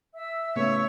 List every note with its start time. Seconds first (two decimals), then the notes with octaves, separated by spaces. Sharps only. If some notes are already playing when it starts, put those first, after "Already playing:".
0.15 E5 E6
0.56 A2 C#3 B3 C#5